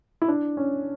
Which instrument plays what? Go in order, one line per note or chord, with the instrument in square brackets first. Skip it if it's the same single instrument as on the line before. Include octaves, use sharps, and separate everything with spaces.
[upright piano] E4
D4
C#4